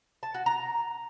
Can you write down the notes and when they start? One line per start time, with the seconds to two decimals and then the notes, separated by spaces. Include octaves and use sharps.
0.23 A5
0.34 F#4
0.46 A#5